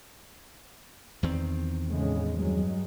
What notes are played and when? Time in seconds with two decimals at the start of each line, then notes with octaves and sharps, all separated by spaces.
1.23 E2 D#3 C4
1.90 A2 C#3 G#3
2.40 G2 F#3 G#3